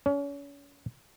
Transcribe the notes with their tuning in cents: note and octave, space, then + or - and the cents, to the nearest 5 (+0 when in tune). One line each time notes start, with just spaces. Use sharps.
C#4 +35